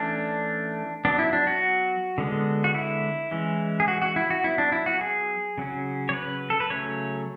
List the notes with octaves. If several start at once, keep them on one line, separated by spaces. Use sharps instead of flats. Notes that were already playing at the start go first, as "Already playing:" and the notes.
Already playing: E3 A3 C#4 D4
F#3 B3 D4
E4
D4
F#4
D3 G#3 B3
F#4
E4
E3 G#3 C#4
G#4
F#4
F#4
E4
F#4
F#3 B3 E4
D4
E4
F#4
G#4
C#3 F#3 C#4
C#5
B4
A4
B4
C#3 F#3 A3 C#4 C#5